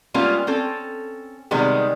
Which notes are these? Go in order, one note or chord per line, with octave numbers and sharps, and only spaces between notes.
G3 G#3 A#3 B3 C#4 F4
C4 C#4 A4
C3 D#3 G3 G#3 B3